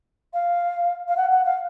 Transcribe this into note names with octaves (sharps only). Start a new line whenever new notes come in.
F5
F5
F#5
F#5
F5